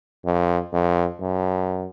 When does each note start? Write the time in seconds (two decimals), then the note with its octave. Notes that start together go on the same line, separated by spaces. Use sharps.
0.25 F2
0.73 F2
1.20 F#2